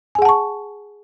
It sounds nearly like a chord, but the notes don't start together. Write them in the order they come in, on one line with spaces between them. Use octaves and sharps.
G#5 G#4 F#5 A5 C#6